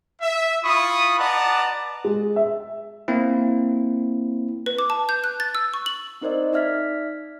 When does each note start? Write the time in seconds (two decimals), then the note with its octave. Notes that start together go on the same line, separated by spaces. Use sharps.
0.21 E5
0.64 E4 F4 B5 C#6 D#6
1.18 B4 D5 D#5 F#5 A5 A#5
2.05 G#3
2.36 E5
3.08 A#3 C4 E4
4.66 B4
4.79 D6
4.90 A5
5.09 G6
5.24 F#6
5.40 A6
5.55 E6
5.74 C#6
5.86 F#7
6.21 C4 D#4 A#4 C5 D5 D#5
6.53 D#4 D5 E5 F6 G#6 B6